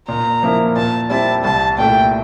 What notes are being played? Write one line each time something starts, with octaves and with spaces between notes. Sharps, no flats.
A#2 A#5
F3 A#3 E4
A#2 A5
G3 C4 E4 A5
C2 A5
A#2 A3 E4 G5